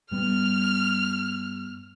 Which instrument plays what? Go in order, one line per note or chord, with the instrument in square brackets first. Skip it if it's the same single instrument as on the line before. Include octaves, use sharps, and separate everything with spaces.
[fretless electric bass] G2 G3 B3 [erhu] F6